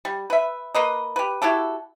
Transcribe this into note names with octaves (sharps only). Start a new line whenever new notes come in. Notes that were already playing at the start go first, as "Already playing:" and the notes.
G3
B4 E5
A#3 B4 D#5
G4 B4
E4 F#4 G4 A4